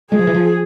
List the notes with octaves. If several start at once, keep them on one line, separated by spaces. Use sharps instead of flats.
G#3 G#4
F3
E3
F3